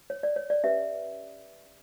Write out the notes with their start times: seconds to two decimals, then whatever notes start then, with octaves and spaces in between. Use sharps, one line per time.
0.10 C#5
0.23 D5
0.36 C#5
0.50 D5
0.64 C#4 G4 B4 E5